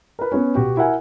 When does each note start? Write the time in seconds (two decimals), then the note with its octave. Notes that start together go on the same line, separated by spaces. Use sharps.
0.19 A#4 B4
0.32 B3 C#4
0.55 B2 F#4 G4
0.77 E4 A#4 F#5 G#5